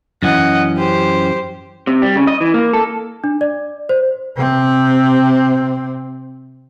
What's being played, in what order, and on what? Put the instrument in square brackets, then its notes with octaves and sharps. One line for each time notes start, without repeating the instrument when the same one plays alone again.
[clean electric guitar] F#2 E3 C#4 [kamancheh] D#5 F#5
[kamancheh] G4 C5
[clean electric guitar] C3
G3
C#3
D#5
E3
A#3
A4
[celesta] D4
D5
C5
[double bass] C3 C4